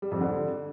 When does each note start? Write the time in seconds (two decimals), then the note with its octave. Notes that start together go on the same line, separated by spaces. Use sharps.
0.02 G3
0.11 F2
0.21 D3